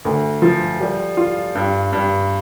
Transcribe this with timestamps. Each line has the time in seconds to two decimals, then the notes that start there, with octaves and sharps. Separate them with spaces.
0.05 D2
0.42 F3
0.80 G3
1.17 F4
1.55 G2
1.93 G2